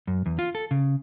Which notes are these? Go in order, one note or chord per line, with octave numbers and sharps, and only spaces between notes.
F#2
E2
F4
A4
C#3